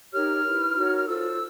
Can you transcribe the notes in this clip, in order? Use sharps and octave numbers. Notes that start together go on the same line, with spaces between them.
D#4 G4 A#4 C#5 F6
E4 G4 B4
D#4 F#4 A#4 C#5
F6
F4 A4 C5 E6